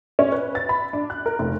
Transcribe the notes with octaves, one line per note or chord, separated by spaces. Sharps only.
C#4
B4
A6
B5
D4
F#6
A#4
F1